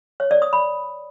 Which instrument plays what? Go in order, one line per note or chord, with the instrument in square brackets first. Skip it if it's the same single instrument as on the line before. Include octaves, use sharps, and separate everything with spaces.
[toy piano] C#5
D5
D#6
B5